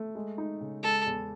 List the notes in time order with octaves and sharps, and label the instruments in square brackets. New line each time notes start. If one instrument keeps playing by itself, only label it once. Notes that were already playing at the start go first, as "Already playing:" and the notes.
Already playing: [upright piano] A3
G#3
D#4
C#3
[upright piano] G#3 [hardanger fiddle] A4
[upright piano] E2